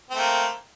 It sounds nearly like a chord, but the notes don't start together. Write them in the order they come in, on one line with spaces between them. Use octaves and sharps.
C4 A3 A#3